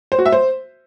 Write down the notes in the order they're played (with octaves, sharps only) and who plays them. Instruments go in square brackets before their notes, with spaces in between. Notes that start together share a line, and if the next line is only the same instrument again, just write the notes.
[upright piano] C5
F#4
E5
C5